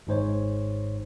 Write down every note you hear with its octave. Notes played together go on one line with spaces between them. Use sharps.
G#1 G#2 C5 C#5